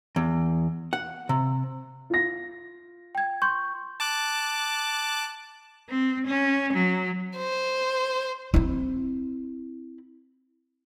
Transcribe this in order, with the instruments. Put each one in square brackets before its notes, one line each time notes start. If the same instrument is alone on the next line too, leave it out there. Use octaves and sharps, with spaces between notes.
[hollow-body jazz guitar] E2
F#5
C3
[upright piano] F4 A#6
[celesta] G5 G#6
C6 C#6 G6
[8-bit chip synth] A5 D6 F#6
[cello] C4
C#4
F#3
[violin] C5
[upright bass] C4 E4